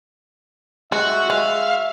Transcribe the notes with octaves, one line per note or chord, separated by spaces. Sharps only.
G#3 F#4 E5
G#3 F5